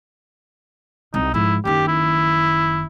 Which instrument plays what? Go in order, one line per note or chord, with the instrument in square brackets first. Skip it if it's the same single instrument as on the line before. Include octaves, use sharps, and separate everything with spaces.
[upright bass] C2 G3 [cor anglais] D#4
[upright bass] G#2 F3 [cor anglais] E4
[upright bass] F#1 D#3 [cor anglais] G4
[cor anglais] E4